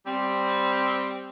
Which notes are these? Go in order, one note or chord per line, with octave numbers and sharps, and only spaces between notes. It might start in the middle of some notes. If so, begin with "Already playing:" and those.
G3 C4